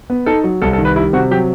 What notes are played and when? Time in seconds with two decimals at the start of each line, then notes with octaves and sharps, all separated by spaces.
0.10 B3
0.26 D#4 A4
0.44 F#3
0.62 C2 A4
0.73 A4
0.78 D#3
0.85 B4
0.96 G3 E4
1.13 C3 F#4
1.31 F#3 G4